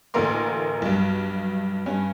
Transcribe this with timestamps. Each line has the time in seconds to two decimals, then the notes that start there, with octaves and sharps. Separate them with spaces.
0.14 A1 D2 A3 A#3 A#4 C6
0.82 B1 G2
1.86 G2 C#4